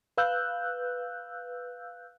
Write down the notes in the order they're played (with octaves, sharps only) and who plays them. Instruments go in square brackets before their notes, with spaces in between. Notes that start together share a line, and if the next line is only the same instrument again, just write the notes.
[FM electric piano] B4 F5 E6 F#6 G6